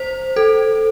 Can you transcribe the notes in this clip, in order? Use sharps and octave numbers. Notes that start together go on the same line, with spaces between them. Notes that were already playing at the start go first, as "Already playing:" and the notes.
Already playing: C5
A4